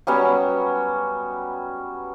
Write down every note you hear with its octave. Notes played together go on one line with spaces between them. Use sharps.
F#3 G3 B3 C#4